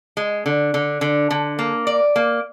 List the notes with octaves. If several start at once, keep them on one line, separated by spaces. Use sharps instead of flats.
G#3
D3
D3
D3
D3
A#3
D5
A#3